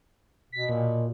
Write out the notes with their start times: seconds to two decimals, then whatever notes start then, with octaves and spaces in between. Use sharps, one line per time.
0.52 B2 B6
0.69 A#2